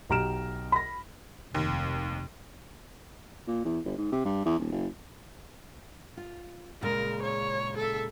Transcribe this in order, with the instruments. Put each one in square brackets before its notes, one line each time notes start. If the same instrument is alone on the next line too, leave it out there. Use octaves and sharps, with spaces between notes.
[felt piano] B1 G4 A#5 F6 D7 E7
B5 A#6
[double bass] F1 [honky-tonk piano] D#2
[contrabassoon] A#2
E2
G1
G#2
C3
G2
E2
D#1
F#1
[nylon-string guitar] F4
[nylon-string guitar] A#2 C#3 G#3 [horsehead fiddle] A#4
[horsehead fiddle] C#5
A4 E5